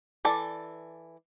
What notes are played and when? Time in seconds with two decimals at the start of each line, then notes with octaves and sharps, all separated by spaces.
0.25 E3 A4 D5